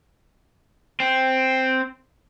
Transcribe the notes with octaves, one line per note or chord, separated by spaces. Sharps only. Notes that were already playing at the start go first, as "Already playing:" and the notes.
C4